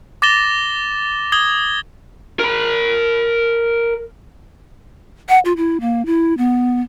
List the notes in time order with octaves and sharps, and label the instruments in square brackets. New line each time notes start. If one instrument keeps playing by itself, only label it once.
[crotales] D6 A6 A#6 E7 G7
D#6 G#6 G7
[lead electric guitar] A#4 B5
[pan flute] F#5
F4
E4
A#3
E4
B3